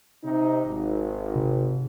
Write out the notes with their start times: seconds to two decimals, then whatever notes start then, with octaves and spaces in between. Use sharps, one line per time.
0.23 C3 D#4
0.66 G#1
1.36 C3